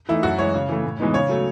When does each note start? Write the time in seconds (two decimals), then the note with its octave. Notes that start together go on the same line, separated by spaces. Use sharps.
0.09 E3 A3 D#4 E4
0.23 F#2 F#4
0.38 E3 G#3 C#5
0.54 C#3
0.69 E3 A3
0.84 A2
0.99 E3 G#3 B3 D#4
1.14 C#3 C#5
1.29 F#3 A3